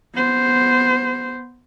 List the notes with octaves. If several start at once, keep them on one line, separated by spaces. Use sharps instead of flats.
B3 C5